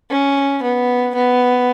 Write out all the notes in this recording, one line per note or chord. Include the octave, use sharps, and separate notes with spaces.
C#4
B3
B3